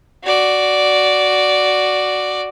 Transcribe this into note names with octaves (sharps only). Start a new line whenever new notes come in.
F#4 D5